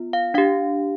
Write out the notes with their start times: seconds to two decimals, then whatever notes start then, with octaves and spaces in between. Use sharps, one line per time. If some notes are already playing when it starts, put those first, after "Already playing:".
Already playing: B3 F4
0.13 F5
0.34 D4 G4 F5